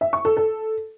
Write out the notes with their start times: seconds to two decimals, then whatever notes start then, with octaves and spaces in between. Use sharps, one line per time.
0.01 E5
0.13 C#6
0.25 A4
0.37 A4